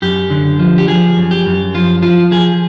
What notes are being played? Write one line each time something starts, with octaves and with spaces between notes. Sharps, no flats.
F#2 G4
D3
F3
G4
F3 G#4
F#2
G4
F#2
F3 F4
F3 F4
F3 G#4